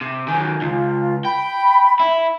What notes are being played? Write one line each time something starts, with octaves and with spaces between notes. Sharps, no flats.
C3
D#3 F#3 G#5
C#2 F4
G5 B5
E4